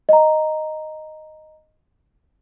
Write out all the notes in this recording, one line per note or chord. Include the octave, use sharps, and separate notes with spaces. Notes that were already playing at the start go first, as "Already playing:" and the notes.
D#5 A#5